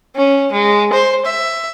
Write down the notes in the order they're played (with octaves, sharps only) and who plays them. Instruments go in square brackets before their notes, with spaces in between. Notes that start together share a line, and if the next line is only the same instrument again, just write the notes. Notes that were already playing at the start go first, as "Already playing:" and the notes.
[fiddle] C#4
G#3
C5
E5